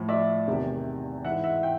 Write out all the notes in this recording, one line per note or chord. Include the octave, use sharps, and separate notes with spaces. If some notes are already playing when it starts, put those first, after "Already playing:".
Already playing: A2 F3
D5 E5
E2 C3 D#3
G#2 E3 E5 F#5
E5 F#5
G5